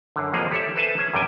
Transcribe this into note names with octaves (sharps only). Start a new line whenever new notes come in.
F#2 D3
F2 F3 G3 A#3 G#4
G4 A4 C#5 D5 E5
A4 B4 C5 E5 G#5 A5
C#4 G#4 G#5
F#2 C3 G3 G5 G#5